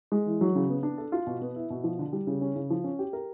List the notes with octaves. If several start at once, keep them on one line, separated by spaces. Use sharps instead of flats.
G#3
E3
F#3
C#3
B3
D4
A4
F4
B2
B3
E4
B2
F3
D3
G3
C#3
C#4
C#3
F3
C#4
G4
A#4